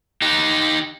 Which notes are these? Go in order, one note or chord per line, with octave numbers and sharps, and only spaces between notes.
D#4 G4